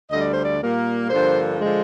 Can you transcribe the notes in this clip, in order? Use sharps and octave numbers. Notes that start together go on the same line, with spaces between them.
D2 D3 G3 D#5
D5
C5
D5
A#2 G3 A#3
G2 D3 F3 A#3 C5
D3 F3 G#3